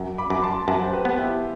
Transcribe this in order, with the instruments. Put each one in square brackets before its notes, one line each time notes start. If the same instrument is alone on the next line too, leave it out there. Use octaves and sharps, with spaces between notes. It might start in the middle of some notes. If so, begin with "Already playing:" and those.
Already playing: [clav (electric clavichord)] F#2
[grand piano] B5 D6
[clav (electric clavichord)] F#2 [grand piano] D6
[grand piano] A5 C6
[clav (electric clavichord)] F#2 [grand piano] F#5 A5
[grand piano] C5
G4 B4
[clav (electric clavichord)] B3
[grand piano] E4 G4